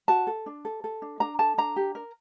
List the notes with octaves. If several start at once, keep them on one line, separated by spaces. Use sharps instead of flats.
F#4 A5
A4
D4
A4
A4
D4
D4 A#5
A4 A5
D4 A#5
G4
A#4